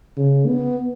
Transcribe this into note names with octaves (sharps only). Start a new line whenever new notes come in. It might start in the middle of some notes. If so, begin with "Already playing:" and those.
C#3
B3